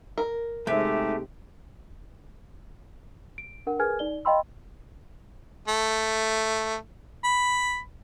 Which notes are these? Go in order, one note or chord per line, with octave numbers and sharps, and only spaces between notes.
A#4
C3 G#3 A3 D#4 G4
D7
D4 A#4 F#5
G#4 A#4 B4 G#5 F6 G#6
D#4 D5 G7
D#5 F5 G5 B5 C6 E6
A3
B5